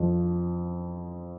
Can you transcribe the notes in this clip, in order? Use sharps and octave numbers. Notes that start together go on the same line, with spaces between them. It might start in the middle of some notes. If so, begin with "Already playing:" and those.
Already playing: F2 F3